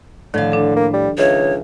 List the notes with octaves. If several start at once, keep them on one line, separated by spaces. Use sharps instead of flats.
A2 D3 D#3 F3 F5
D4 A4
A#3
G3
C#2 D#3 C#5 E5 F5